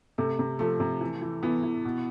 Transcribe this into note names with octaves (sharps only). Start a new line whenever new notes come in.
C3 A3
C3
F3 A3
C3
E3
E3
E3 B3
E3
B2